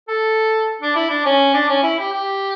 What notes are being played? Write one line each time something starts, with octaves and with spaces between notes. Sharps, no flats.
A4
D4
E4
D4
C#4
D4
C#4
E4
G4
G4